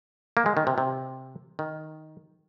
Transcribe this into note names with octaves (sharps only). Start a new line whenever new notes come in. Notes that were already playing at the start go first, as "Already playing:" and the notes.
A#3
G#3
D#3
C3
C3
D#3